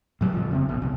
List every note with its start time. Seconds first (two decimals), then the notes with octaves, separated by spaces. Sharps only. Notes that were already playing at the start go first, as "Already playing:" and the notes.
0.21 A2 F#3 G3
0.33 F#1 F2 F3
0.51 C#3 A#3 C4
0.66 A#1 B2
0.82 C2 B2